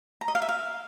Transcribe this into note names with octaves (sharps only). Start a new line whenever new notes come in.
A#5
D#5
F5
E5
F5